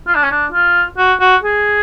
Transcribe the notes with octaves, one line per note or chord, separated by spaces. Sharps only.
F4
D4
C#4
D4
F4
F#4
F#4
G#4